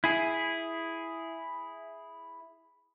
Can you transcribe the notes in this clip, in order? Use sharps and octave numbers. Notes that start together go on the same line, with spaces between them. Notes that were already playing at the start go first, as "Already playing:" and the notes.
E4 G#4